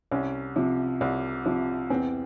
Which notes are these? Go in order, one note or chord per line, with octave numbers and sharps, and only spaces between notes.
C2 C#4
C3 F3
C2
C3 F3
E2 C4